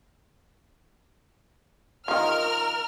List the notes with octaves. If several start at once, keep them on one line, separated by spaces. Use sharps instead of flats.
D#3 F3 A#4 F6